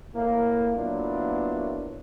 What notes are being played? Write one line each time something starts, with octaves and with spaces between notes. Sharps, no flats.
A2 A#3
F#3 A#3 B3 D4 E4 F4